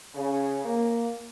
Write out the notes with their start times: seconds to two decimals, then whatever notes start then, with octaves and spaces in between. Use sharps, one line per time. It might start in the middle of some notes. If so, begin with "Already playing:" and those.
0.15 C#3
0.65 A#3